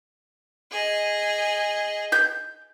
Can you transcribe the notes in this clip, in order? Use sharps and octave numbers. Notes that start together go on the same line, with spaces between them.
G#4 D#5
G6